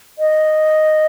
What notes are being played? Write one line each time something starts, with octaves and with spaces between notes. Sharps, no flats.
D#5